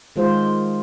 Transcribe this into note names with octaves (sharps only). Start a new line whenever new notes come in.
D#3 G#3 F4 G#4 C5